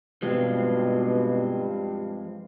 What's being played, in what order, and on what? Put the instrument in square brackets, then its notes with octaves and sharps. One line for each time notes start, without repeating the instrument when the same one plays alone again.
[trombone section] G2 [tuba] B2 [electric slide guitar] F3 G#3 C4